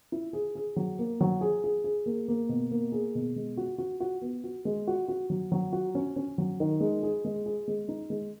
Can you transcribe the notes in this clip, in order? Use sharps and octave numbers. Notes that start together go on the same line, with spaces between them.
E4
G#4
G#4
F#3
A#3
F#3
G#4
G#4
G#4
A#3
A#3
B2
A#3
G#4
B2
G#3
F#4
F#4
F#4
B3
F#4
G#3
F#4
F#4
F#3
F#3
F#4
C#4
C#4
F#3
D#3
G#3
G#4
G#3
G#4
G#3
D#4
G#3